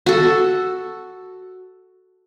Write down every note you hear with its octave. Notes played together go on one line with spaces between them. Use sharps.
F#4 A4